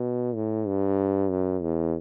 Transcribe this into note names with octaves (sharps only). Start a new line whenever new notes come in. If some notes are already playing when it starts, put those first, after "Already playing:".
Already playing: B2
A2
G2
F#2
E2